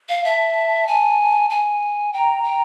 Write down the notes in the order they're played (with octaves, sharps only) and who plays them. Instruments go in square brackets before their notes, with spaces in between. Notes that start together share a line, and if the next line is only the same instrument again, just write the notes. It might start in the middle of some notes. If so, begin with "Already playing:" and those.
[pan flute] F5
[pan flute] E5 [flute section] A5
[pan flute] G#5
G#5
[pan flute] G5 [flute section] A#5
[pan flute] G5